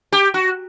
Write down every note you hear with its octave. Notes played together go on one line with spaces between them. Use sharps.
G4
F#4